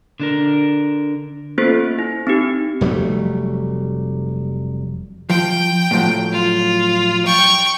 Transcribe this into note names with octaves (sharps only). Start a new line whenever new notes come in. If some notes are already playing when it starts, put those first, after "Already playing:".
D3 D4 A#4
A#3 B3 C#4 F4 A4 C5
E4
C4 D#4 G4
F1 F#3 G3 A3
F3 G5
A2 F3 F#3
F4
G5 C#6